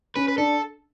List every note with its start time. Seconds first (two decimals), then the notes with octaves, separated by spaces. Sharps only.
0.16 C#4 B4
0.28 B4
0.38 D4 A4